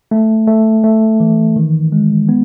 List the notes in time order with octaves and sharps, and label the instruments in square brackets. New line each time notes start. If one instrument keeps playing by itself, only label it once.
[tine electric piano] A3
A3
A3
E3
D#3
G#3
B3